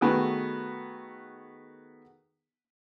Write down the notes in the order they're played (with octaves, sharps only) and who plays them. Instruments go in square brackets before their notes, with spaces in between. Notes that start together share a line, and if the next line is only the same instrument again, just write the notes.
[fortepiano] D#3 A3 B3 F#4 G#4